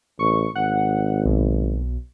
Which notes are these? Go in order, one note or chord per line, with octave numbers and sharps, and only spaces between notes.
A1 C#6
G#1 F#5
B1